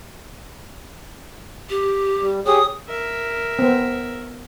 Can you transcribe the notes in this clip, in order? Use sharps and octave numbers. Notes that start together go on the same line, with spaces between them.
G4
G3
G4 G#4 C#5 D#6
A#4 E5
B3 C4